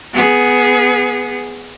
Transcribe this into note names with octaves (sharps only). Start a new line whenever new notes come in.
B3 G#4